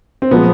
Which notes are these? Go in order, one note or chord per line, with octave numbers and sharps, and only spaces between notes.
C4
A#2 F3 G#3 B3